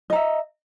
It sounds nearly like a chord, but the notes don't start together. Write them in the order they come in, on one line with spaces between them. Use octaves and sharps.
D#5 A#5 E5